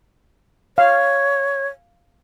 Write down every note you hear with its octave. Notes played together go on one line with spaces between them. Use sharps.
C#5 F5